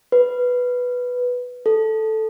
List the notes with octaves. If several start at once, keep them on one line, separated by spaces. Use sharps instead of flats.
B4
A4